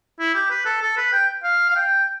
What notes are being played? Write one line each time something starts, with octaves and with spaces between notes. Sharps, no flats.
E4
G4
B4
A4
A4
B4
G5
F5
F5
G5